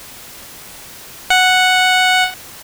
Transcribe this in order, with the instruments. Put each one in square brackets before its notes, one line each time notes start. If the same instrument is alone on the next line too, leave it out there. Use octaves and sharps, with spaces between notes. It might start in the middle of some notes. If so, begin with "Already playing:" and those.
[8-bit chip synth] F#5